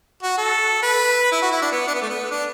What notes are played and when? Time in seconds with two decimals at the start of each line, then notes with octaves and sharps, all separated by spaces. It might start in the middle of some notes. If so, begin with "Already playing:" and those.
0.23 F#4
0.38 A4
0.83 B4
1.32 E4
1.42 F#4
1.52 E4
1.62 D4
1.72 B3
1.87 D4
1.94 B3
2.02 A3
2.10 B3
2.31 D4